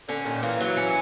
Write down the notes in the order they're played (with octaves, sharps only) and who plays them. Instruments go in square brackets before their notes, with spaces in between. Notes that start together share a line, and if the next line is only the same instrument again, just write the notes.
[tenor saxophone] D3 [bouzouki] C#4
[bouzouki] A#2 [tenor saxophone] D#3
[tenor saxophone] E3 [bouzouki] A#3
[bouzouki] F#3
C#4